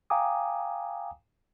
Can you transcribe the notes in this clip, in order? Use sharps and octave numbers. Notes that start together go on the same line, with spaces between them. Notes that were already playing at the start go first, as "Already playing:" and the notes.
F5 G5 G#5 A#5 D6 D#6